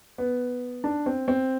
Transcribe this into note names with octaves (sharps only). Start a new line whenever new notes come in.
B3
D4
C4
C4